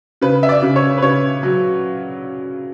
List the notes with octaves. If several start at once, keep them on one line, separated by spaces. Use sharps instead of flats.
C#3 B4
E5
D5
C#3
C#5
B4
C#3 C#5
F#3